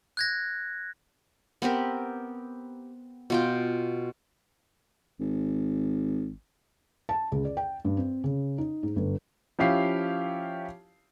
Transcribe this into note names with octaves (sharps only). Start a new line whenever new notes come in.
F#6 G#6 A#6
B3 C4 G4 A#4
B2 F4 G5
G#1
A5
C#2
D5
G5
G2
C4
C#3
D#4
G#2
G1
F3 C#4 E4 G4 F5 C7